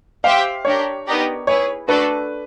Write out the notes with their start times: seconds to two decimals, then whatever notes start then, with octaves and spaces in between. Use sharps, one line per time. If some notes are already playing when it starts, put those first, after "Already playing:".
0.24 G4 C5 E5 F5 G5
0.65 D4 G4 A#4 C#5
1.06 B3 D#4 G4 A#4 D5
1.47 E4 G#4 B4 C#5
1.88 A3 D4 F#4 A4 B4 D5